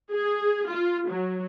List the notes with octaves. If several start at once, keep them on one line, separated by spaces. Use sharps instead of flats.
G#4
F4
F#3